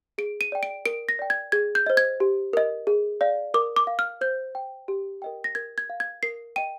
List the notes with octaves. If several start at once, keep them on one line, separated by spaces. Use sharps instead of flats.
G#4 D7
D#7
D5 G5
D7
A#4 D7
A#6
D5 G5
G#6
G#4 G#6
G6
C5 D#5
G#6
G4
A#4 D#5
G#4
D5 F5
A#4 D6
D6
F5
F6
C5 G6
G5
G4
A#4 D#5 G5
A#6
A#4 G#6
G#6
F5
G#6
A#4 C7
D#5 G5 D#7